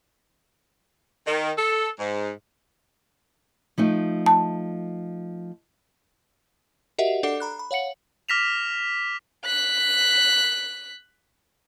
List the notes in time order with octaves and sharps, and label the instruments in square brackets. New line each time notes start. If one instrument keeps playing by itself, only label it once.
[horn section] D#3
A4
G#2
[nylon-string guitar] F3 A3 D#4
[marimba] A5
[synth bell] F#4 G4 A#4 D#5 E5 F#5
D4 A4 D5 F#5 D6 C7
A#5 B5 F#6
B5
C#5 F5 F#5 C#7 F#7
[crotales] D6 F6 A#6 B6 E7 F7
[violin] F#6 B6